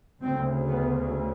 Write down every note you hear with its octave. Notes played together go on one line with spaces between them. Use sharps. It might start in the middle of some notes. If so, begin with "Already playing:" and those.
D2 C#3 C4
B3